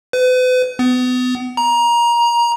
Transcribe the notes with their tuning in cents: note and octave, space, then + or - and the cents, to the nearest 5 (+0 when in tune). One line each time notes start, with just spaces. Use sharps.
B4 +40
B3 +30
A#5 +20